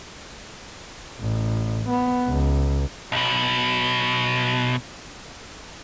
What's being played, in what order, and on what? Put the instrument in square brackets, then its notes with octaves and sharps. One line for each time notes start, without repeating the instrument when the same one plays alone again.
[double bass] A1
B3
C#2
[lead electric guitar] B1 B2